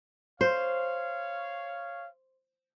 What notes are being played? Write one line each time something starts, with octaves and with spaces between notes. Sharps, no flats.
C5 C#5 F5